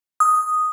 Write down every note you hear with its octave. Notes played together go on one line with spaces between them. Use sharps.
D#6